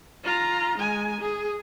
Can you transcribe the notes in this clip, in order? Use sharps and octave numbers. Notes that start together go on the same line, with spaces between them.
F4 A#5
G#3 G#5
G#4